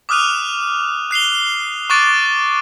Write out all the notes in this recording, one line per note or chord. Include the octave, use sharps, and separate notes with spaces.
D6 D#6 F6 F#6 D#7 F7
F#6 C7 F7 G7
C#6 D6 F#6 A6 D7